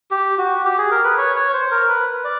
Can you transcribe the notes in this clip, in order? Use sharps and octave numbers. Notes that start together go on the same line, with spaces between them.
G4
F#4
G4
G#4
A#4
B4
C#5
C#5
C5
A#4
B4
D5